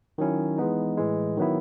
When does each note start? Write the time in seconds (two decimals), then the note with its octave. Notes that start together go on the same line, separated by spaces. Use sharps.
0.18 D#3 F#3 C#4 E4
0.58 E3 G#3 B3 D#4
0.98 A2 E3 G#3
1.37 D#3 F#3 B3 E4